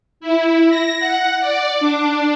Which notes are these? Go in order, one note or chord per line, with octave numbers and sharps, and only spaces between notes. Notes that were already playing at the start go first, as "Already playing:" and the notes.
E4
A#6
F#5
D5
D4